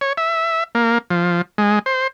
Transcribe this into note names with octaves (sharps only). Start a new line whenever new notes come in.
C#5
E5
A#3
F3
G#3
C5